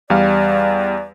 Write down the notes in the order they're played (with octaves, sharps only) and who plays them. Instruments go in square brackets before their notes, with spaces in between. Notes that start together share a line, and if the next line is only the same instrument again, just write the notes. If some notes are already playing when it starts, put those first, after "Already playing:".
[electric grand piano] E2 G3 F5 [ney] D5